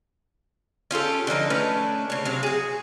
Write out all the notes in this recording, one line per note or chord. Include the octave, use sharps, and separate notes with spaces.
C#4 F4 G4 A4
D3 E3 F3 D#4
A3 C#4 D4 B4
C#3 C#5
C3 F#3 F5
F#4 G#4